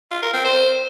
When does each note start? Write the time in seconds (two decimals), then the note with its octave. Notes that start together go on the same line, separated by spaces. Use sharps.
0.11 F4
0.22 A#4
0.33 C4
0.45 C5